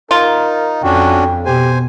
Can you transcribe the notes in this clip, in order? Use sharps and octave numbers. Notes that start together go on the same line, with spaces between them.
D#4 F4 A#4
F2 C#4 D4 F#4 G5
B2 G4 C5 G#5